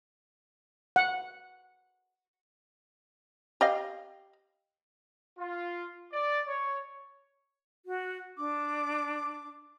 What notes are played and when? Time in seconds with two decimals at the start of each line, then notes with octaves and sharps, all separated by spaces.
0.96 F#5
3.61 G4 D#5 F5
5.38 F4
6.13 D5
6.48 C#5
7.86 F#4
8.37 D4 D6